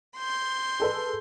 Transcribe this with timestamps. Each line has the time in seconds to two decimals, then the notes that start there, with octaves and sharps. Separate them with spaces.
0.17 C6 G6
0.80 G#4 A4 B4